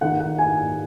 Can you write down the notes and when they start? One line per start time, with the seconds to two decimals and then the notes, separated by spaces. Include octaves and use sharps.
0.01 D#3 F#5
0.20 F#5
0.38 G#5